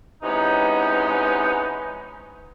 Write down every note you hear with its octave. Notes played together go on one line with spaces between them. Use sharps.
C3 E3 G#3 B3 C#4 D#4